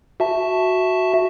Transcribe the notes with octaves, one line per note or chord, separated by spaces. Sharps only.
F#4 E5 A5